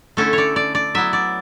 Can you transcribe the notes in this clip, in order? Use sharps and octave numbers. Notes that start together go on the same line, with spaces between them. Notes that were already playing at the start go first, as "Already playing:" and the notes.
D3 A3 C#4 E4 A4
C#5 D5
D5
D5
F#3 B3 E4 E5
D5